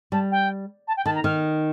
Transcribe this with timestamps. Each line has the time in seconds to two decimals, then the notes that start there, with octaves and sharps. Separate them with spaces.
0.12 G3 A5
0.31 G5
0.87 A5
0.96 G5
1.05 D#3 A5
1.15 A#5
1.24 D#3 F6